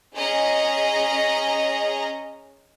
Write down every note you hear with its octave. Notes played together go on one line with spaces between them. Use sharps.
C#4 G#4 D#5 A#5